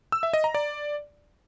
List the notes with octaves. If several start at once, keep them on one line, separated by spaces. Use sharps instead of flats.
E6
E5
D#5
A#5
D5